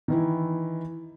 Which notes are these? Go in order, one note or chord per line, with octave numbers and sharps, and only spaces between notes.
D#3 E3 E4